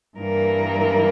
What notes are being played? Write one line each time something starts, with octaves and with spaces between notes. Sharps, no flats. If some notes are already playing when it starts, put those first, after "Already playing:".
G2 E3 G3 A#3 A#4